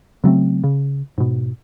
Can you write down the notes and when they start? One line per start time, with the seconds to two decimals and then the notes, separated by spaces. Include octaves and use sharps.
0.24 C#3 F#3 A3 C4
0.64 C#3
1.18 G#2 B2